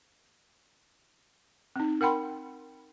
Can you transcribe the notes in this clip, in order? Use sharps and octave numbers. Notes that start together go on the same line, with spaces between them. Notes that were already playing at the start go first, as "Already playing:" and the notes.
C4 D#4
A#4 F#5 G5 B5 C6